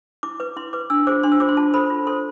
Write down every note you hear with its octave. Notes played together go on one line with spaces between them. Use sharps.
E4 D6
B4 D6
E4 C6
B4 D6
D4 E6
F4 G#4 C5 D6
D4 C6
E6
F4 G#4 C5 D6
C6
F4 A5
A4 C5 B5
F4
A4 C5 C6